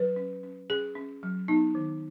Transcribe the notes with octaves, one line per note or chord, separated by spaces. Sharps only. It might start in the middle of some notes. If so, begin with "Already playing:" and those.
Already playing: F#3 B4
C#4
C#4
C#4 G#4
C#4
F#3
B3 D#4
D#3